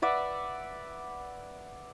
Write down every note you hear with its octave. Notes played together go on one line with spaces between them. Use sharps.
B4 D5 E5 F#5